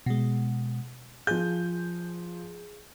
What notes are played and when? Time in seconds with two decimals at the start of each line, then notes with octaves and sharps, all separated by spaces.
0.06 B2 G#3
1.27 F3 G#4 G6